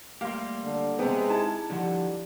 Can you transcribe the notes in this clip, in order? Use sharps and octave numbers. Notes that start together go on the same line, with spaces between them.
G3 A3 A#3 G4 F5 C6
D3
C3 G#3 B3 C5 G5 A5
D#4 E4 G4 A5
D3 F3 G3 F#5